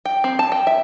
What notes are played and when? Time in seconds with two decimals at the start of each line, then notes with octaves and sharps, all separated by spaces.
0.05 G5
0.24 C4
0.39 A5
0.52 G5
0.67 E5